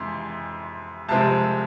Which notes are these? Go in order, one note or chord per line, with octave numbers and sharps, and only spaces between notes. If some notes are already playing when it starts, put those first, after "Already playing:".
Already playing: F2 C3 E3 G#3 C6
C2 C3 F3 G#3 C4 A5